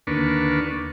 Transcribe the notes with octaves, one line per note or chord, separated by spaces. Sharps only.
D#2 D3 A#3 D4 B4 C#6